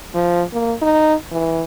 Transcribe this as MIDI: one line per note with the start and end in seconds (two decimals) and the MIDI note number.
0.14 0.42 53
0.53 0.74 58
0.82 1.14 63
1.31 1.64 52